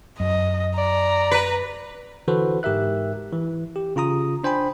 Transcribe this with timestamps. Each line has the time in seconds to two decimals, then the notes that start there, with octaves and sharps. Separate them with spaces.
0.20 F#2 D#5
0.78 D5 A#5
1.31 B4
2.28 D3 E3 F#4 A4 B4 C5
2.63 G#2 G4 A#4 E5 F#6
3.32 E3
3.76 G4
3.96 C#3 F4 A#5 D#6
4.44 D4 C5 G5 G#5 B5